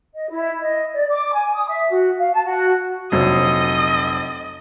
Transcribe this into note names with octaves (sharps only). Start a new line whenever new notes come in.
D#5
E4
D#5
D5
D6
G#5
D#6
E5
F#4
F5
A5
F#4
F1 A#1 F#3 D#5